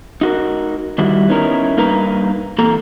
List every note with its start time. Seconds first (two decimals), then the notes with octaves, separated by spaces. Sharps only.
0.21 D#4 F#4 A#4
0.98 D#3 G3 E4 F#4
1.29 B3 C#4 D#4 E4 A#4
1.77 G2 A#3 D#4 A#4 B4 A#5
2.58 E2 A#2 A#3 A4 A#5